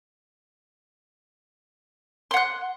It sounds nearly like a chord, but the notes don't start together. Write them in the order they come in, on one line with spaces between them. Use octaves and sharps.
C6 F#5 F#6